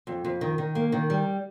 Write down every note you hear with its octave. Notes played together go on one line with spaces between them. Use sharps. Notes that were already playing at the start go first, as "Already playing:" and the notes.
F2
F2
D#3
D#3
A#3
D#3
G3